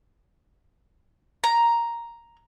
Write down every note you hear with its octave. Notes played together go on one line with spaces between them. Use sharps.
A#5